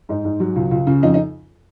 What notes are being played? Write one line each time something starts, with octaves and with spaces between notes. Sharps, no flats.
G#2 D#4
G#2
F#3
C#2
C#2
C#3
F2 D#4
D#4